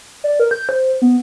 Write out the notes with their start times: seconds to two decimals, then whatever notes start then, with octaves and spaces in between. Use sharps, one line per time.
0.24 D5
0.40 A#4
0.51 G6
0.69 C5
1.02 B3